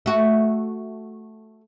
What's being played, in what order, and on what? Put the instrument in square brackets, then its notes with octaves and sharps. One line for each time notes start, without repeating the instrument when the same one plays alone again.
[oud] A3 F#4